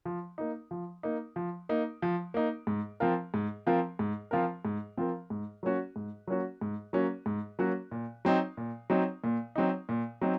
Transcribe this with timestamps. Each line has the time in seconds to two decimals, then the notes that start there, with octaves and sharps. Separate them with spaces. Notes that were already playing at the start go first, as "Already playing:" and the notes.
0.05 F3
0.38 A#3 D#4
0.71 F3
1.03 A#3 D#4
1.36 F3
1.69 A#3 D#4
2.02 F3
2.34 A#3 D#4
2.67 G#2
3.00 F3 C4 F4 A#4
3.34 G#2
3.67 F3 C4 F4 A#4
3.99 G#2
4.31 F3 C4 F4 A#4
4.65 G#2
4.97 F3 C4 F4 A#4
5.30 G#2
5.63 F#3 A#3 C#4 F#4
5.96 G#2
6.27 F#3 A#3 C#4 F#4
6.61 G#2
6.93 F#3 A#3 C#4 F#4
7.26 G#2
7.59 F#3 A#3 C#4 F#4
7.91 A#2
8.25 F#3 C4 D#4
8.57 A#2
8.90 F#3 C4 D#4
9.24 A#2
9.55 F#3 C4 D#4
9.89 A#2
10.21 F#3 C4 D#4